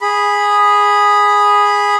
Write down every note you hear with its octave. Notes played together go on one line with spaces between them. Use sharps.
G#4 B5